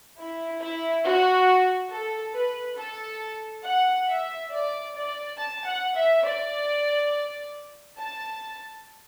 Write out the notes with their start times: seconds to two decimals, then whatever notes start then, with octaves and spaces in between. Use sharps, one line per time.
0.18 E4
0.61 E4
1.04 F#4
1.91 A4
2.35 B4
2.77 A4
3.64 F#5
4.08 E5
4.51 D5
4.95 D5
5.38 A5
5.66 F#5
5.96 E5
6.24 D5
7.98 A5